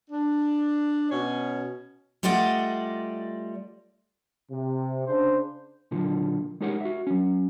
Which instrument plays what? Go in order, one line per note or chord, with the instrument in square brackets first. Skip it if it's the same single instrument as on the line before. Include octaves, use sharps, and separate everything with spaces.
[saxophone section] D4
B2 C#4
[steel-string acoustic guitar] G3 A3 F4 D5 D#5 F#5
[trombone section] C3
C#3 D4 C5
[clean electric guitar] A#2 D3 F3 F#3
G#3 D#4 G4 A#4 C#5 F#5
F#4 E5
F#3 C#4